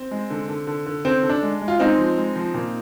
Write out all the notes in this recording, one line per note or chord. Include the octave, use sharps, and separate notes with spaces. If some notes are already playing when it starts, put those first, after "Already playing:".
Already playing: C4
G#3
D3
D3
D3
D3
D3 C4
D3
D4
G#3
G#3
F4
G#3 C4 D#4
F3
G#3
F3
A#2